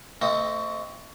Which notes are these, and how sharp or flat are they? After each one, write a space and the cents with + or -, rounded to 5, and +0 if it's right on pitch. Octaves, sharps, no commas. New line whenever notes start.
A3 +35 C4 +0 D#5 +0